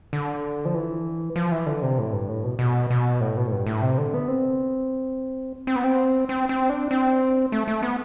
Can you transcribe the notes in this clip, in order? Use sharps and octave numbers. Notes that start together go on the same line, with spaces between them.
D3
F3
E3
F3
E3
D3
C3
A2
G2
A2
B2
B2
B2
A2
B2
A2
G2
A2
C3
D3
B3
C4
C4
B3
C4
C4
C4
D4
C4
A3
A3
B3